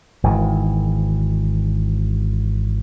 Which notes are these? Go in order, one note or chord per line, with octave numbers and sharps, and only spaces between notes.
G#1 D#3 E3